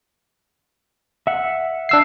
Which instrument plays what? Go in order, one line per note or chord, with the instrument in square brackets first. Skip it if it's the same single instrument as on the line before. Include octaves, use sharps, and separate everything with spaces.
[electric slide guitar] E5 F#5
[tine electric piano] D4 E6 C7